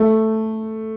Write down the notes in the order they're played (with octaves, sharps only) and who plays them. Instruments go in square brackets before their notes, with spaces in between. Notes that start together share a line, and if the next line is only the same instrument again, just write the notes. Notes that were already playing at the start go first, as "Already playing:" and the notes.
Already playing: [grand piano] A3